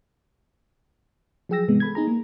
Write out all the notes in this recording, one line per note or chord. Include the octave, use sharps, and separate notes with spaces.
F3 F#3 G#4 G5 E6 A#6
G#2 C3 E3 G#3 B3
A4 B5 G#6
B3 D#4 G#4 A#5
A#3